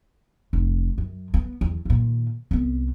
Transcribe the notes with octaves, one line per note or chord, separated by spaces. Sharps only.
F1
F#2
B3
E2
A#2 D#3
C2 B3